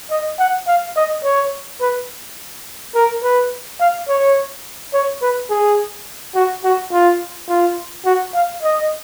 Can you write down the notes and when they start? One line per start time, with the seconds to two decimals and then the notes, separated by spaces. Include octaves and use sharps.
0.10 D#5
0.39 F#5
0.67 F5
0.96 D#5
1.23 C#5
1.81 B4
2.95 A#4
3.23 B4
3.80 F5
4.08 C#5
4.94 C#5
5.22 B4
5.50 G#4
6.35 F#4
6.64 F#4
6.92 F4
7.49 F4
8.05 F#4
8.34 F5
8.62 D#5